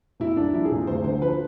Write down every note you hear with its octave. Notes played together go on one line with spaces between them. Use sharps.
C3 E4
C2 D4
F3 E4
G#4
C3
D2 C5
D3 C5
F3 B4